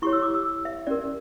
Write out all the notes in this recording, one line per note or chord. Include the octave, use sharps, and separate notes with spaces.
E4 G4 C#5 C#6
E6
D6
E6
E5
C#4 G4 A#4 D5